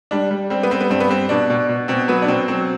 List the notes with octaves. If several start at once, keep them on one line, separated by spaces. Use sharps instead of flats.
G3 D4
G3
G3 C4
B3
G3 C4
B3
G2 C4
B3
G3 C4
B2 D4
B2
B2
B2 C4
F#3 B3
D4
B2 C4
F#3 C4